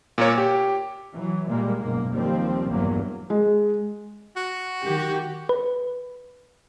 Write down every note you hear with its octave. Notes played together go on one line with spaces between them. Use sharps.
A#2 A#3 C#5
G4
E3 F#3
A#2 G3 G#3 A#3
F#1 G#2 B2 A#3
D#2 F3 G3 C4
A#1 E2 G2 F#3 A#3
G#3
F#4
D#3 G4
B4